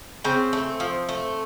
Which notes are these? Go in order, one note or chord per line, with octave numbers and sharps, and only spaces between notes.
C#3 C4
A3
F3
A3